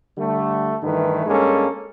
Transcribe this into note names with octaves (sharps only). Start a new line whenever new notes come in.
D3 G3 A3
G2 D#3 E3 A3 B4
G2 G#3 A#3 C#4 A4